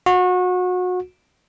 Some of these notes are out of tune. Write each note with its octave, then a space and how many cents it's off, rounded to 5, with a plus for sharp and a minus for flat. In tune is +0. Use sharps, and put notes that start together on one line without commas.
F#4 -30